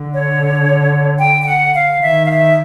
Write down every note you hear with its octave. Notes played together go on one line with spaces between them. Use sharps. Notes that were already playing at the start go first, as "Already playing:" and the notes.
Already playing: D3
C#5
G5
G5
F#5
F5
D#3 E5
F5
E5